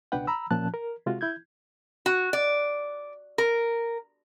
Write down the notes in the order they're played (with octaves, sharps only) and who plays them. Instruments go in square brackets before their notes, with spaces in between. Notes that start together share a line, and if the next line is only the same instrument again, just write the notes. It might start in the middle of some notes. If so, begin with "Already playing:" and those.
[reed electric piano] C#2 B2 D4 B4 F#5 G5
A#5 B5 E6
A#2 F3 C#4 A5 F#6
A#4
C3 G#3 F4 F#4
E4 G6 G#6
[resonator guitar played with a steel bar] F#4
D5
A#4